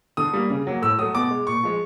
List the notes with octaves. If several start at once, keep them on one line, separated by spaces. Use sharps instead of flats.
D3 D#6
G3 A#3
C#3
F#3 A#3
A2 E6
F#3 A3 D#6
B2 D6
G#3
A#2 C#6
F3 G#3